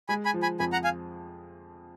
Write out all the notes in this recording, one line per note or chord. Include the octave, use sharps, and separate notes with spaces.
G#3 G#5 B5
G#5 B5
F3
G#5 B5
F2 G#5 B5
F#5 A#5
F5 G#5